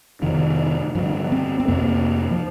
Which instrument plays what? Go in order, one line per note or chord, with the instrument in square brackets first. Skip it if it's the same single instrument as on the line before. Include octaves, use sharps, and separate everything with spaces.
[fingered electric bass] F2 C3 D#3
G2 D3 F3
C4
C4
F2 C3 A#3
F3